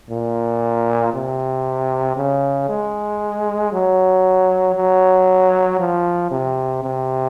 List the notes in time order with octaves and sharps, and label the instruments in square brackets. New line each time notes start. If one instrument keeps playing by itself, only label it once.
[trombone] A#2
C3
C#3
G#3
F#3
F#3
F3
C3
C3